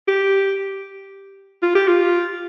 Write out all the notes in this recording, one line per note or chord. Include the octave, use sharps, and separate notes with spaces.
G4
F4
G4
F4